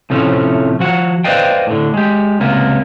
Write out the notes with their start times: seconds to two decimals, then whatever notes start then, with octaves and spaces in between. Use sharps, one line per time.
0.10 A2 C3 F3 A3 C#4
0.80 F3 F#4 F#5
1.24 B4 C5 D5 D#5 F5 G5
1.67 A2 D3
1.94 G#3 G4
2.40 C#2 C3 A#3 B3